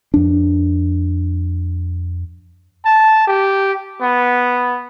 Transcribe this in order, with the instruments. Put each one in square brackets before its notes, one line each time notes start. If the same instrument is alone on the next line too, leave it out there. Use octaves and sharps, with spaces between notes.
[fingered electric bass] F2 D4
[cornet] A5
G4
B3